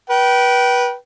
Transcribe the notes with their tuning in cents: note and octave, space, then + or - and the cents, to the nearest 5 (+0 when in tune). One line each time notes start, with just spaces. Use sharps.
B4 -25 G5 -25